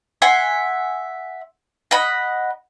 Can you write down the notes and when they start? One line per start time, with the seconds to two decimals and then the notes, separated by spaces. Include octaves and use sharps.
0.22 E5 F#5 G#5 C6
1.91 D#5 F#5 B5